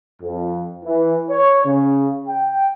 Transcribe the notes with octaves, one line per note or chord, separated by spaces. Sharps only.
F2
E3
C#5
C#3
G5